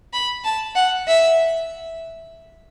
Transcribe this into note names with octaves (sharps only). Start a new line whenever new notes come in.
B5
A5
F#5
E5